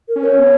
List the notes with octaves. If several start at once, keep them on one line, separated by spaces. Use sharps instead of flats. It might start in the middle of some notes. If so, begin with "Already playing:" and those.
A#4
C#4
C#5
B3